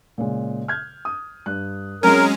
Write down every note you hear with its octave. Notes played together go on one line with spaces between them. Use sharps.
A#2 C#3 G#3
F6 G6 G#6
D#6
G2 F#6
F#3 G#3 C4 C#4 A#4